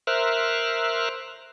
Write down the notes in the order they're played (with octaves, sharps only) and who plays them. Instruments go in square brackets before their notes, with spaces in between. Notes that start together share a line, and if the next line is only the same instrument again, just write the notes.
[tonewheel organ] A#4 C5 E5 F6 F#6